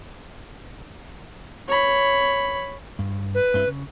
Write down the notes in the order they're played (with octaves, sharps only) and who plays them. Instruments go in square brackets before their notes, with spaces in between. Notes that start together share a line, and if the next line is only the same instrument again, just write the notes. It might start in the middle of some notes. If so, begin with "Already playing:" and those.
[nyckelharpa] C#5 B5
[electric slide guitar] G2
[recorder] B4
[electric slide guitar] G2 C4 E4
C#3